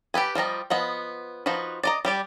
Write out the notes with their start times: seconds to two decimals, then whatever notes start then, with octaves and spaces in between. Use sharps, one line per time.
0.14 G4 A4 B4 G#5
0.35 F3 G3 D#5 A#5
0.70 F3 B3 D#5 F#5
1.46 F3 D#4 F#4 B4
1.83 D5 D#5 A#5
2.05 G3 G4 D5